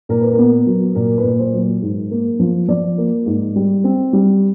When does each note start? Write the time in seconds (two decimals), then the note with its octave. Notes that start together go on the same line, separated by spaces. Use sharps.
0.09 A#2 A#4
0.21 B4
0.33 A#4
0.38 B3
0.67 F#3
0.95 A#2 A#4
1.18 B4
1.24 A#2
1.39 C5
1.54 F#3
1.82 G#2
2.11 A#3
2.40 F3
2.68 F3 D5
2.98 A#3
3.26 G#2
3.56 G3
3.84 C4
4.13 G3